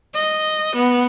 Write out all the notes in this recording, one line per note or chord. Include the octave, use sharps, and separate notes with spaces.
D#5
B3